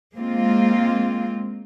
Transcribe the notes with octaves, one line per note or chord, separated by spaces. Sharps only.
G#3 A#3 C4 F4